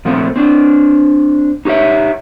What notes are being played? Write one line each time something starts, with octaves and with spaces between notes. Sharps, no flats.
A#2 F3 A3 C4
C4 D4
D#4 G4 G#4 C#5 E5